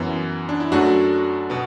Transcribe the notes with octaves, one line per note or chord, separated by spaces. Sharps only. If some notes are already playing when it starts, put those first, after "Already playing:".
Already playing: F#2 E3 B3
D4
E4
F#2 F#3 A3 D4 F#4
B2 B3